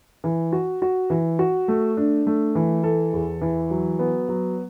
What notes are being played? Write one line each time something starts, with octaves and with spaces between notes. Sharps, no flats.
E3
F#4
F#4
E3
F#4
A3
D4
A3
E3
A4
E2
E3
F#3
B3
F#3